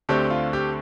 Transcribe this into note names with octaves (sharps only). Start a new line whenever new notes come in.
D2 D3 A3 C4 G4
F4
G4